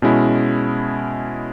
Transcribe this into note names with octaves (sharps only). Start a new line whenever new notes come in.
B2 G#3 C#4 E4